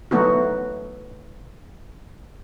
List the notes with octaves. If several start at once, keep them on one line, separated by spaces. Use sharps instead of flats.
F#3 A3 B3 D#4 F#4